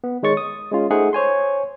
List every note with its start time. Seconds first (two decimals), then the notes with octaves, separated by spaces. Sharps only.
0.04 B3
0.23 D#3 G#3 C#5 C#6 A6
0.37 D#6
0.72 G#3 C#4 F4
0.90 A3 D#4 G#4 C5 F#5
1.13 C5 C#5 G#5 C6